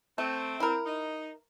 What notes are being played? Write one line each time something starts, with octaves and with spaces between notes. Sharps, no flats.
A3 C4
E4 A#4
D#4